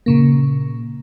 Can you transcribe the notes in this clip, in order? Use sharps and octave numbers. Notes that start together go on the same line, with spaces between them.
A#2 C#3 A#3